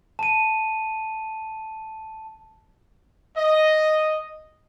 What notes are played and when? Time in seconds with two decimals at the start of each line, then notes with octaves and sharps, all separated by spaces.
0.19 A5 D#7
3.37 D#5